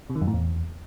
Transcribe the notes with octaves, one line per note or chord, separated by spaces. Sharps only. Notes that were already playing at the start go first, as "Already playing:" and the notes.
C3
D#3
F#2
A2
E2